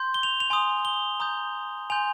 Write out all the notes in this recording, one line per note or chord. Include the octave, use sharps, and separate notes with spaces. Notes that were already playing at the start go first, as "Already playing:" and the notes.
Already playing: C6 G6
G7
F7
F7
G#5 C6 D#6
G7
A#5 D#6 G6
G#5 C6 G6 F7